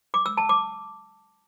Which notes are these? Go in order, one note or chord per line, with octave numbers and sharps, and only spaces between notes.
D6
E6
A5
D6